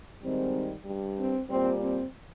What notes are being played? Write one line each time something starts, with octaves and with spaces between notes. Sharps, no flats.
G#2 D#3 G3 C4
G2 G3
C4
A#2 G3 C4
C4